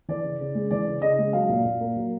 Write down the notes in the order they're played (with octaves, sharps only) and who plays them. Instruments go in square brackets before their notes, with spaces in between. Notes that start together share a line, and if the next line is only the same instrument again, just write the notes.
[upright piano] E3 D5
C#3
C#3
G#3
E3 D5
C#3
C#3 D#5
G#3
F#3 F5
A#2
A#2
A#3
F#3